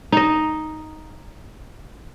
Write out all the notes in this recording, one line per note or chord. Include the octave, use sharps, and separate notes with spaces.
D#4 D#5